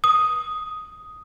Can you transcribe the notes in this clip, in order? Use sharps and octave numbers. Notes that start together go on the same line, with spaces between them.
D#6